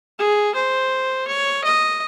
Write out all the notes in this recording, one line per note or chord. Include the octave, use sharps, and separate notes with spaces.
G#4
C5
C#5
D#5